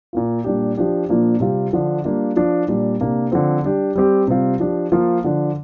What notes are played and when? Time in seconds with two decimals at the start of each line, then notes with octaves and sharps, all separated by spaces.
0.13 A#2 A#3 F4
0.44 A#2 G3 D4 G4
0.77 F3 D4 G4
1.09 A#2 F3 A#3 D4
1.40 C3 G3 C4 F4
1.73 D3 F3 D4
2.05 G3 A#3 D4 F4
2.36 F3 D4 F4
2.68 A#2 G3 D4
3.01 C3 A#3 D4
3.32 D3 F3 C4
3.64 G3 D4 G4
3.95 G3 C4 G4
4.28 C3 G3 C4 F4
4.60 F3 D4 G4
4.92 F3 A#3 F4
5.24 D3 F3 D4